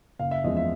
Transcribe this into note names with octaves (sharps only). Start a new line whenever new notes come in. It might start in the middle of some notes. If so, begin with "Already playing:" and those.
F#1 F5
E5
E2 C#3 F3 G#3 D#5
E5